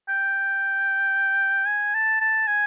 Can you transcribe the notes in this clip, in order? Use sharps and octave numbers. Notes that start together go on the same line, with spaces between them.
G5
G#5
A5
A5
G#5